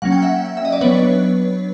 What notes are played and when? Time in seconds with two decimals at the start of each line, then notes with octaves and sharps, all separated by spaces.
0.02 F#3 A#3 C#4 F#5
0.12 G5
0.22 E5 F#5
0.57 E5
0.65 D#5
0.72 D5
0.81 F#3 B3 D4 B4 C#5